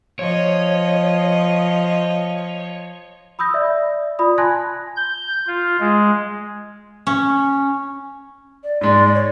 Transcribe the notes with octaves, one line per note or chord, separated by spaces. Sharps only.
F3 C#5 D#5
B5 D#6 E6 G6 A#6
D5 E5
F4 D5 B5 D#6
G#5 A5 C6 F#6 G#6 A#6
G6
F4
G#3
C#4
D5
G#2 G#3 D5
C#5